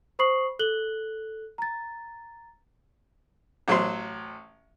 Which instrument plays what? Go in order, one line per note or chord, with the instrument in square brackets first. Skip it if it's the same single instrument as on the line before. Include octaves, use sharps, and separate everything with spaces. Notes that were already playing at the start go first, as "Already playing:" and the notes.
[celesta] C5 B5 C#6 D#6 C7 F#7
A4 F#6 F#7 G7
A#5 A6
[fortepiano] A1 F#3 C5 C6